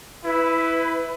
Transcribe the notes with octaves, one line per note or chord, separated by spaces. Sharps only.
E4 B4